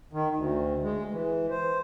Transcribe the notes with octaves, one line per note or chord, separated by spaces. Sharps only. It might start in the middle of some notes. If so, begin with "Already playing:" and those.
D#3
D2
G#3
E3
C5